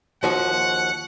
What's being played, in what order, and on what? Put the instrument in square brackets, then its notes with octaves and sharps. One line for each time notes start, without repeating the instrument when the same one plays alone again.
[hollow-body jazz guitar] D#2 F3 F#4 [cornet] F#5